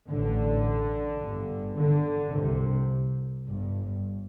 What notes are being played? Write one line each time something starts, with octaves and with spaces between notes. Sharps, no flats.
A1 A2 D3
G1 G2
D3
C2 C3
G1 G2